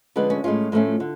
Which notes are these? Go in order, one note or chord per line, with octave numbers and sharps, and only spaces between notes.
D3 F3 G#3 C#4 B4
C#4
A2 G#3 C#4 F4
A2 F3 A3 C#4
D3